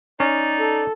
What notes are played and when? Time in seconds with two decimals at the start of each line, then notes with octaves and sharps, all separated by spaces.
0.20 C#4 D#4 D5
0.60 A4